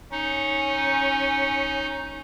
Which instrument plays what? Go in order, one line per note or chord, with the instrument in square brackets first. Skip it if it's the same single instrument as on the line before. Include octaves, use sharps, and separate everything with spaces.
[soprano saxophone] C#4 [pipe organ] D#4